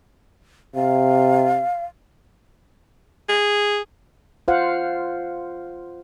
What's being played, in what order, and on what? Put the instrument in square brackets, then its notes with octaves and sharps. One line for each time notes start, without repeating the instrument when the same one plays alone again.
[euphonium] C3 [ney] F5
[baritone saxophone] G#4
[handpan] F4 C5 F5 F#5